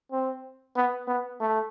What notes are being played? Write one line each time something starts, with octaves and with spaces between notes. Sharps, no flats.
C4
B3
B3
A3